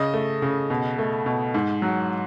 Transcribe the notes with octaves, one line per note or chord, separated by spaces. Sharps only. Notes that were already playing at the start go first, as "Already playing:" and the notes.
Already playing: C#3 D#5
A3
C#3
B2
A3
B2
G#2
F#3